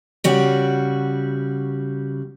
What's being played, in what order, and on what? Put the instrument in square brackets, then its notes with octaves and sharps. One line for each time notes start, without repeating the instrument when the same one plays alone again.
[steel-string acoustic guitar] C#3 G3 F#4